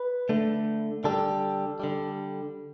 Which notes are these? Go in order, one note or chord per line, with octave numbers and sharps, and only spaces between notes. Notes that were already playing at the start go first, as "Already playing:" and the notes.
Already playing: B4
D3 A3
D3 G3 A4
D3 G3